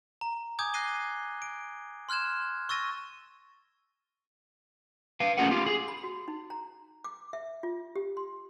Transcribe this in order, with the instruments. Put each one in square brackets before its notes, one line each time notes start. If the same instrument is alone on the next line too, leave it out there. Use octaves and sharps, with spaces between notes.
[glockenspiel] A#5
G#5 D6 D#6 G6 G#6
F#6 A#6 C7 D#7 G7
D7
C6 F6 F#6 G#6 E7
C#6 E6 A6 A#6 D#7
[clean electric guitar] B4 F5
A3 C#4 F4 G#4 A#4 F#5
F4 G4
G#4
[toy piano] B5
F#4
D#4
A#5
D6
E5
F4
G4
C6